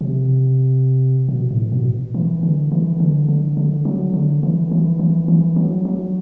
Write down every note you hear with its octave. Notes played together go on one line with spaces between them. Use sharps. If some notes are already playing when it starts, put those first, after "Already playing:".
C3
B2
A2
B2
E3
D3
E3
D3
D3
D3
F#3
D3
E3
E3
E3
E3
F#3
F#3